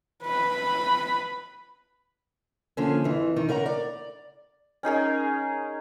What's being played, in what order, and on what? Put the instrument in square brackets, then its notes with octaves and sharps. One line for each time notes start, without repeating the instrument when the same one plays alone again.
[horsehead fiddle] B4 B5
[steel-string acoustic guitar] D3 F3 A#3 C#4
F2 E3
D#3
C#3 A#4 F#5 A#5
D5
[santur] C#4 D#4 G#4 A#4